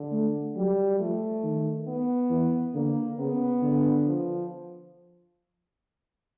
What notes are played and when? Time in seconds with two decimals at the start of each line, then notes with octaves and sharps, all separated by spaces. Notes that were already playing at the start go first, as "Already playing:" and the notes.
Already playing: D3
0.12 A3
0.56 F#3 G3
1.00 F3 A3
1.44 D#3
1.88 B3
2.31 E3
2.74 D3 A#3
3.19 C#3 B3
3.62 D3
4.06 F3